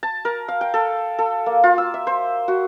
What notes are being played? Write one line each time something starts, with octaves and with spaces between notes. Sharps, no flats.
A5
A#4
F5
G5
A4
A4
A#3
F4
E6
E5
C5
F#4